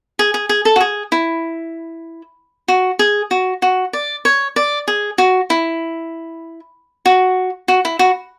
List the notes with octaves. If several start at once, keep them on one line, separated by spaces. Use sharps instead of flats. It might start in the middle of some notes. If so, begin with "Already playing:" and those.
G#4
G#4
G#4
A4
F#4
G#4
E4
F#4
G#4
F#4
F#4
D5
C#5
D5
G#4
F#4
E4
F#4
F#4
E4
F#4